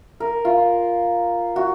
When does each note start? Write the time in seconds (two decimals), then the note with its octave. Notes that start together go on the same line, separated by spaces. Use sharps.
0.20 A#4
0.45 F4
1.56 F#4